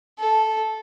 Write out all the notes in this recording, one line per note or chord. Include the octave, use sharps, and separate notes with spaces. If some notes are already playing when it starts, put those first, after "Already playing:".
A4